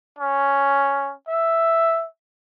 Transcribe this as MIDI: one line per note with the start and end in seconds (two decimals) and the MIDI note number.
0.19 1.12 61
1.28 2.07 76